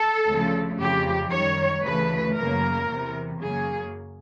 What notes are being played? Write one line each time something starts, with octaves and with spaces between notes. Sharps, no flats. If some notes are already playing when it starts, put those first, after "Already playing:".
Already playing: A4
D2 C#3 F3 A3
F2 C#3 F3 G4
F#2 D#3 G3 C#5
D2 C#3 E3 A3 B4
F#2 C#3 F#3 A#3 A#4
E2 C3 E3
F#2 C#3 F#3 A#3 G#4